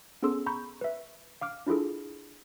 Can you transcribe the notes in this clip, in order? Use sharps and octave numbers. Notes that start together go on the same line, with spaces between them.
B3 C#4 G#4 A4 C6 E6
A#5 B5 C#6 G6
B4 E5
F5 D6 F6
D4 E4 F4 G#4 A4